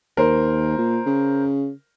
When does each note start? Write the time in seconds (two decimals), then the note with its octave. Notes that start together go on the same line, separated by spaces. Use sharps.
0.17 D#2 A#4 C5
0.78 A#2
1.06 C#3